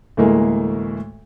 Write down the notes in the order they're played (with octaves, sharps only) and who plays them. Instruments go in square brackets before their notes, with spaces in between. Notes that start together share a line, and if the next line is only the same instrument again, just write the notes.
[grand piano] D2 A2 E3 G#3 A#3